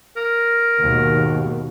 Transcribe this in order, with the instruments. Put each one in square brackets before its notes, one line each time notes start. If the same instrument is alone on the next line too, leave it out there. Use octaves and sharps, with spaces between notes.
[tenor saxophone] A#4
[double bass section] D#2 G#2 B2